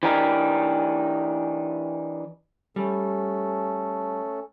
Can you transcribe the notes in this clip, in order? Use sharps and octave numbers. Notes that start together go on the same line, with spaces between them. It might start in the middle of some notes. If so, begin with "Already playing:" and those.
E3 D4 D#4 G4 A#4
G3 A3 C#4 A4